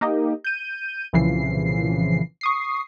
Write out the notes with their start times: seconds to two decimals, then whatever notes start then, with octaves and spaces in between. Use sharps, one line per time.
0.01 A#3 D#4 G4 D#5
0.44 G6 D#7
1.13 C2 A#2 C#3 E3 F3 C7
2.41 C#6 D#6 C7